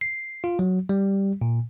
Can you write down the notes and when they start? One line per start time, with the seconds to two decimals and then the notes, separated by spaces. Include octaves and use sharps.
0.01 C7
0.44 F4
0.59 F#3
0.89 G3
1.41 A#2